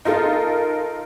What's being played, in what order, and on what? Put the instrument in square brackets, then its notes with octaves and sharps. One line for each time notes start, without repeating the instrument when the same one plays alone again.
[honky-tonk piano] D#4 F4 A4 [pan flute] A#4